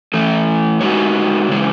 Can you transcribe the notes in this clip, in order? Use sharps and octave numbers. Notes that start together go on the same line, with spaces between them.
E3 A3 E4
G#3 D#4 F#4 C#5
C#3 E3 G#3